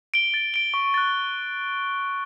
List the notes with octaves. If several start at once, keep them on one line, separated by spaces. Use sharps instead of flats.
D7 G7
A6
D7 G7
C#6
F#6 A6